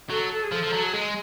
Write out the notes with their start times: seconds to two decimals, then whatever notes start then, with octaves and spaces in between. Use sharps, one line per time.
0.10 F#3 A4
0.31 A4
0.44 G#4
0.51 F3 A4
0.63 F3
0.73 F#3
0.83 G#4
0.94 G#3